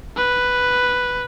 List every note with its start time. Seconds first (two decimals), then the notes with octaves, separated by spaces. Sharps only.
0.17 B4